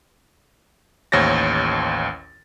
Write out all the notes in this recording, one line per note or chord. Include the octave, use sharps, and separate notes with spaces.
A1 D#2 C5 C#5 A6 A#6